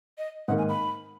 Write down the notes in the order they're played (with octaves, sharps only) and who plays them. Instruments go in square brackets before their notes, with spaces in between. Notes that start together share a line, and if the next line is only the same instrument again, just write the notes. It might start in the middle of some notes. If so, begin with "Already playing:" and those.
[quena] D#5
[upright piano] G#2 D#3 A#3 [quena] F#5
[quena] G#5
B5